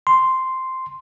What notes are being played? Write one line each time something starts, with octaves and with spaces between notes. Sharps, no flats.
C6